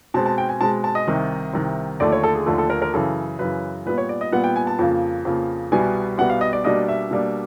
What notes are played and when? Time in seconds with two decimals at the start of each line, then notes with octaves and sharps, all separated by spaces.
0.14 B2 G#3 C4 A5
0.26 A5
0.38 G5
0.49 G#5
0.61 B2 G#3 C4 A5
0.84 A5
0.95 D#5
1.07 C2 C3 D#3
1.53 C2 C3 D#3
2.00 D#2 D3 F3 A3 D5
2.12 C#5
2.24 A4
2.35 G#4
2.46 D#2 D3 F3 A3 A4
2.58 A4
2.70 A#4
2.82 A#4
2.93 F#2 C#3 E3 A4
3.39 F#2 C#3 E3 B4
3.86 A#2 G3 B3 B4
3.98 C#5
4.09 D5
4.21 D#5
4.32 A#2 G3 B3 F#5
4.44 G5
4.56 G#5
4.67 A5
4.79 F2 C#3 F3 A#3
5.25 F2 C#3 F3 A#3
5.72 C2 B2 G3 B3 G#5
6.18 C2 B2 G3 B3 F#5
6.30 F5
6.41 D#5
6.53 D5
6.64 B2 G3 A#3 D4 D#5
6.88 E5
7.11 B2 G3 A#3 D4